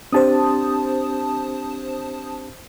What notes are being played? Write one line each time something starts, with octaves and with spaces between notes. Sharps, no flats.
C4 D4 G4 C5 A5 D#6